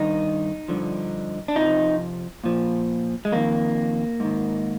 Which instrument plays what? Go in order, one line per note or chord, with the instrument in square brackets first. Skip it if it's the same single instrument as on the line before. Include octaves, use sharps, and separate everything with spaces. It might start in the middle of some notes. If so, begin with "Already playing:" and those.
Already playing: [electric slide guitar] G2 D#3 D#4
G2 D3 F3
D4
F2 C3 F3 D#4
A#2 F3
G#3
F2 D#3 A#3
G#2 D#3